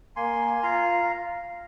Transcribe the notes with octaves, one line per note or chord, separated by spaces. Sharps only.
A#3 G#5 C6
F4 F5 A#5